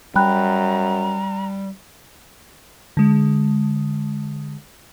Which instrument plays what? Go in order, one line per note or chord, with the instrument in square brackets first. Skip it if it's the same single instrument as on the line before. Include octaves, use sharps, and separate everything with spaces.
[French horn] F#2 [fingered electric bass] G3 [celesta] G5 B5 F#6 [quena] A#5
[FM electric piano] D3 G#3